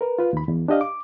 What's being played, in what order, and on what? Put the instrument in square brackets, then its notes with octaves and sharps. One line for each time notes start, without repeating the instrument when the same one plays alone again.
[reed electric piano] A#4 B4
F4 B4
D#2 B5
E2
D4 G4 D#5 F5
D6